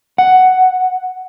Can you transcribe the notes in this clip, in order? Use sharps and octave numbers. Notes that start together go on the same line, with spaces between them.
F#5